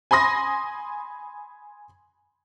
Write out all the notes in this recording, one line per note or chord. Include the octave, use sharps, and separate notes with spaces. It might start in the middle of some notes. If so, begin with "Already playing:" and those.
G#5 B5 C6 D#6 A#6